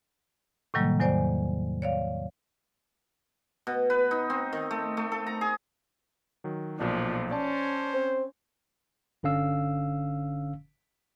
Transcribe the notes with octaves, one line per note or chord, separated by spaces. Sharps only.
A2 C3 D#3 F#3 G3 A#3
E2 F#3 C5 D5 G#5
C#5 D5 F5
B2
B4
D#4
C4
D#3
A3
A3
A4
A#5
G#4
D#3 F#3
B1 A#2 F3 D4 D5
C#4 C5 D5 A5
C4
G1 D3 C#4 F5 E6